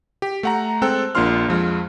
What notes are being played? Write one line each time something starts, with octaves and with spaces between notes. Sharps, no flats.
G4
A3 F#5 A#5
G#3 C4 A4 G5 F#6
A#1 A#3 D4 F4 C6 F6
F2 F3 G#3